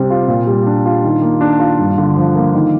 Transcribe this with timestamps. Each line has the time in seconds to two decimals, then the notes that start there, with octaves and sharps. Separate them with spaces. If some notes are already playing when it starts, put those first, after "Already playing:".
Already playing: C3 G3 C4
0.10 F4
0.28 A#2
0.47 G3
0.66 D4
0.86 F4
1.04 D#3
1.22 A#3
1.41 D4
1.59 F4
1.79 G2
1.98 D3
2.16 F3
2.36 A#3
2.54 D#3